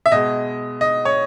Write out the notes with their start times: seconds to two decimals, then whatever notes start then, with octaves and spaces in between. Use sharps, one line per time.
0.06 E5
0.11 B2 G#3 D#5
0.81 D#5
1.05 C#5